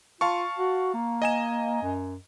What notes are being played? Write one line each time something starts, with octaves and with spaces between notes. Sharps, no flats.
F4 F5 A5 C#6
F#4
A#3
D#5 G#5 E7
F#2